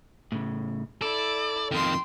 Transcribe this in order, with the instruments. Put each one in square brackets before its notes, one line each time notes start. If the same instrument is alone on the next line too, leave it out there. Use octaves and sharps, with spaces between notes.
[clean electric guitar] A2 C#3
[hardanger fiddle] E4 [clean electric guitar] A4 [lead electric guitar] D5
[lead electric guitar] F2 D#3 [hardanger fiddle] G5 C6